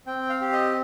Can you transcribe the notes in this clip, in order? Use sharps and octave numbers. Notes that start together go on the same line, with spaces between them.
C4 G5
F5
G4
D#5